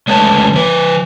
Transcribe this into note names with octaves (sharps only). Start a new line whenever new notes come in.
C#3 G#3 A3 B4 C#5 A5
F3 B4